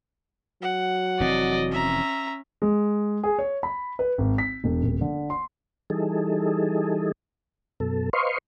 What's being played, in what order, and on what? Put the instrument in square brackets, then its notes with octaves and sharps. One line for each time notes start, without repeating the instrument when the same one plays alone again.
[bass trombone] F#3 [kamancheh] F#5
[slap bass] F1 E3 C4 [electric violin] D5 D#5
[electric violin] C#4 [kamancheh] E5 A#5
[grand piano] G#3
G#4
C#5
B5
B4
G#1
B6
E1
D#1
D3
C6
[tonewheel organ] E3 G3 D#4 G#4 A4
F#2 B2 A4
B4 C5 D#5 F5 C6 C#6